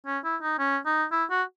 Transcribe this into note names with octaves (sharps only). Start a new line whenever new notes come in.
C#4
E4
D#4
C#4
D#4
E4
F#4